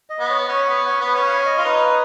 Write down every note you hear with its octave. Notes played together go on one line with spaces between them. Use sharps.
D#5
B3
C#5
C#4 C#5
B3
C#4
B3
B4
C#4
F5
C#5
D#5
F4
D#4 B4